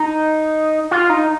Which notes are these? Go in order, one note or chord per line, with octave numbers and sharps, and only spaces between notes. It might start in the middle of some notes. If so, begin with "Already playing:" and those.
Already playing: D#4
F4
D#4